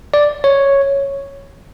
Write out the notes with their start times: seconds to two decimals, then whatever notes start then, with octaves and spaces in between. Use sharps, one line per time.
0.14 D5
0.44 C#5